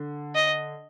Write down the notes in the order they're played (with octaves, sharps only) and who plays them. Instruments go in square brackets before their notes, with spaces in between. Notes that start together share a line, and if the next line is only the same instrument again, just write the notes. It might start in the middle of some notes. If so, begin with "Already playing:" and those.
Already playing: [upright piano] D3
[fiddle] D#5